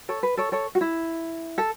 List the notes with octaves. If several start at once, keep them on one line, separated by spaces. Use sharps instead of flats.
A4 C#5
B4
A4 C#5
A4 C#5
F#4
E4
A4